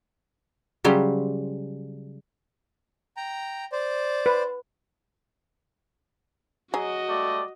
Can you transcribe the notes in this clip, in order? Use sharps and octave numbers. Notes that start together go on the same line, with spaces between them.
C#3 F#3 G3 C5
G5 A#5
C5 D5
B4
F#3 F#4 G#4 D#5
G3 A3 D5